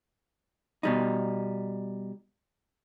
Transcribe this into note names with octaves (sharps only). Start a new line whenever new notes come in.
B2 G3 D#4